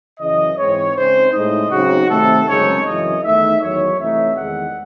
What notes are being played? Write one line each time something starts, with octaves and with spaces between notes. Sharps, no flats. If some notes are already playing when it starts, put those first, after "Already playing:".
F#2 C#3 E3 D#5
G#2 E3 G#3 C4 C#5
C#3 G#3 C4 D#4 C5
A2 G#3 D#4 D#5
C#3 F#3 C4 D#4 F#4
C3 D#3 A3 C4 A4
F#2 C#3 G#3 C4 D#4 C#5
F#2 C#3 E3 D#5
E2 D#3 A3 D#4 E5
E2 D#3 F#3 C#5
C3 E3 A3 C4 D#4 E5
E2 D#3 G#3 F#5